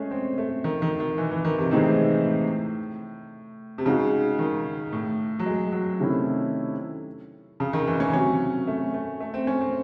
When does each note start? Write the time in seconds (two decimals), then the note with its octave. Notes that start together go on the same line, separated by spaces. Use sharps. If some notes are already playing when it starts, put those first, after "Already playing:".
Already playing: G#3 A3 C#4 G#4
0.11 C4
0.38 A3
0.64 D#3
0.82 D#3
1.00 D#3
1.18 E3
1.31 E3
1.45 D#3
1.58 C3
1.71 A2 C3 E3 G#3 C4 D#4
2.25 A2
3.78 C3
3.86 C#3 G#3 D#4 F#4
4.39 D#3
4.93 A2
5.39 F#3
5.46 G#3
5.73 F#3
6.00 C3 D#3 A3 C#4 E4
7.60 C#3
7.73 D#3
7.87 E3
8.00 C#4
8.13 C3 F#3 C4 C#4 F#4
8.67 A3
8.94 A3
9.20 A3
9.34 C4
9.47 C#4
9.61 C4